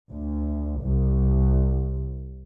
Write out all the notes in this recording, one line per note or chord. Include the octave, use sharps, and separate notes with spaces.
D2
C2